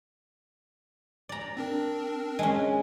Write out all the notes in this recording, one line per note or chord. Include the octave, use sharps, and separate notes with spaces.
D5 A#5
C4 D4 A#4
G#3 C#4